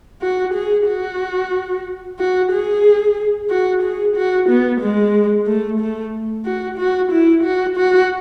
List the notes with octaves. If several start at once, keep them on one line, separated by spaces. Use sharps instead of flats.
F#4
G#4
F#4
F#4
G#4
F#4
G#4
F#4
B3
G#3
A3
A3
F#4
F#4
E4
F#4
F#4